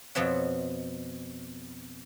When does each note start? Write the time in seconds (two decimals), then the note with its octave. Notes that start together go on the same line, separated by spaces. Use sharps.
0.15 F2 B2 C4 C#5 E5 F#5